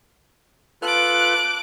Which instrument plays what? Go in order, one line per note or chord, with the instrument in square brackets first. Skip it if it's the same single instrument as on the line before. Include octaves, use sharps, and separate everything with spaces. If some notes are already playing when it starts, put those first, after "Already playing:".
[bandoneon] F4 A4 B4 [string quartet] D6 F#6